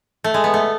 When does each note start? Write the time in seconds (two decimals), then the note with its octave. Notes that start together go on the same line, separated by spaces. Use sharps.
0.24 A3
0.34 G#3
0.44 B3
0.54 A3